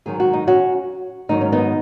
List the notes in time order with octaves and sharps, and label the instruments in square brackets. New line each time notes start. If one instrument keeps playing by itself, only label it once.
[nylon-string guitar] G#2 D#3 F#3 G#4
F#4
D#4
C#4 F#4
G#2 D#3 F#3 D#4
C#4
B3 D#4